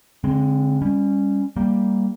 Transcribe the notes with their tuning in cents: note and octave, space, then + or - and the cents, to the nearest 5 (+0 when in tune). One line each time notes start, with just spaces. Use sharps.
D3 -35 G#3 +0 C4 +10
G3 +30 C#4 +0
G3 +0 A#3 +0